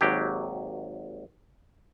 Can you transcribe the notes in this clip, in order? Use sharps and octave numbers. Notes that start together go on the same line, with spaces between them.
G#1 D#2 F#3 G4